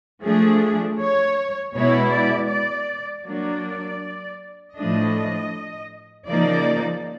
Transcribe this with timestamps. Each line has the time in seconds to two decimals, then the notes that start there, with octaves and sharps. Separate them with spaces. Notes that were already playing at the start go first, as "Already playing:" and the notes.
0.25 F3 A3 D4 G#4
1.00 C#5
1.75 B2 G#3 B3 E4 C#5
2.13 D5
2.51 D5
3.26 F#3 A#3 D4 D5
4.76 A2 F3 A3 D4 D#5
6.27 C#3 F3 A#3 D#4 D5